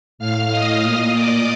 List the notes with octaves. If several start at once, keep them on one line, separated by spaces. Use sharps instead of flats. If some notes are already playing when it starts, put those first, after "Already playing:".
A2 F5 F6
D#5 D#6
A#2
D5 D6